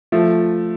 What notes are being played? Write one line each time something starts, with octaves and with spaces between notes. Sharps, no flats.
F3 A3